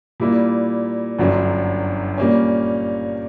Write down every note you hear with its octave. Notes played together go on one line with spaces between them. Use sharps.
A#2 G3 A#3 E4
G1 F#2 D3 F#3
A#2 G3 A#3 C#4